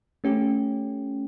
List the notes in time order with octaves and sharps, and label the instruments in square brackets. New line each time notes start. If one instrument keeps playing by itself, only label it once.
[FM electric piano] A3 C#4 G4